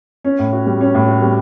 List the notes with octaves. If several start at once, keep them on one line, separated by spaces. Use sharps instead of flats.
C#4
A2
F#4
G3
C#4
A2
F#4
G3